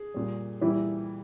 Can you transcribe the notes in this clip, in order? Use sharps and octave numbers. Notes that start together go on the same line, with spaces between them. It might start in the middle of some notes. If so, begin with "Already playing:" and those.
Already playing: G#4
A#2 G3
A#2 E3 G3 E4